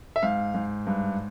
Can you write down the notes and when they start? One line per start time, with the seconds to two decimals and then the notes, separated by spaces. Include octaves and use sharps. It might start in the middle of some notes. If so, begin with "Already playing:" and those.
0.16 E5
0.22 G#2 F5
0.54 G#2
0.87 G2